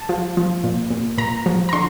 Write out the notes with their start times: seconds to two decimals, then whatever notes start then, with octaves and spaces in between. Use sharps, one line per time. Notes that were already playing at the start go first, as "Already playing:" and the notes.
Already playing: A5
0.09 F3
0.37 F3
0.64 A#2
0.90 A#2
1.18 A#2 A#5
1.46 F3
1.69 A#5
1.73 D3 C6